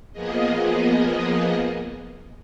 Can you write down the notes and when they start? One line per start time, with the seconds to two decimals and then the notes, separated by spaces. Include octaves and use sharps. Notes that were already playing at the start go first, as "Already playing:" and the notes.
0.12 F3 A#3 B3 G#4 D#5